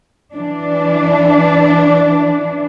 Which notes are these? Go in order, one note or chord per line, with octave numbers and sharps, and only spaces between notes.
E3 D4